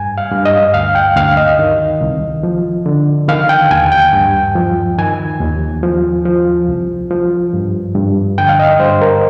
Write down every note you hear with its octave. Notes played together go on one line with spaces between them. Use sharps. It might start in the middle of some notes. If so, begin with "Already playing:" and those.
Already playing: G2 G#5
F5
G2
D#5
D2 F5
G5
D2 F5
D#5
D#3
C2
F3
D3
D#3 F5
G5
D#2 G#5
G5
G2
F3
D#3 G#5
D#2
F3
F3
C2
F3
G2
G2
D3 G5
F5
D#5
G2 C5
A#4